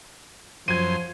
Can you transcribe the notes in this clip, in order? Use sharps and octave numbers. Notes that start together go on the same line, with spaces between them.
F#2 F3 C5 G#6 D#7